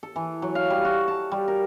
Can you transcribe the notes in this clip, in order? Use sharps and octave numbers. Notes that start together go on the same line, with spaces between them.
A4
E3
F#3
F5
G3
F#4
A5
G3
A#4